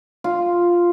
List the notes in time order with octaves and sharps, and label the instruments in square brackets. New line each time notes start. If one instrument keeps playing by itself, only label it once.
[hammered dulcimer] F4